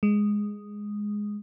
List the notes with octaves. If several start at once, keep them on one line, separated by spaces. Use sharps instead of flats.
G#3